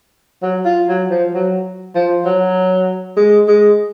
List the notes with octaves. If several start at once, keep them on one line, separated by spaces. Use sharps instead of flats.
F#3
F4
F#3
F3
F#3
F3
F#3
G#3
G#3